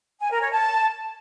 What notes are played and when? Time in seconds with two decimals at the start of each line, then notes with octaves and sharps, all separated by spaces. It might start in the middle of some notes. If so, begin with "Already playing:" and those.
0.20 G#5
0.31 A#4
0.41 C#5
0.52 A5